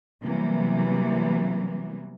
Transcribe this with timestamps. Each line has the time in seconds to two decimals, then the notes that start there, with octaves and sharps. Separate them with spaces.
0.23 C3 E3 F#3 G3 A#3 B3